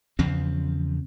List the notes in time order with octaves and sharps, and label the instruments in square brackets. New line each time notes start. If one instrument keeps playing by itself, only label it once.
[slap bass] E2 C#3 F3 C4